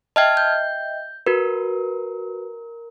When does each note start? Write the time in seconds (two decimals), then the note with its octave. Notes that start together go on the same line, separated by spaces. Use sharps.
0.16 D#5 E5 G5 A5 F6 G#6
0.37 G6
1.27 F#4 A#4 B4